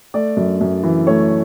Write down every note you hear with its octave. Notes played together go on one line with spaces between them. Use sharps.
A3 D5
F#2
F#2
E3
A3 C#5